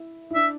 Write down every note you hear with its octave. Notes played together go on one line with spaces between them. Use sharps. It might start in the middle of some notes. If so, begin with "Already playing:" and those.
Already playing: E4
E4
D4 E5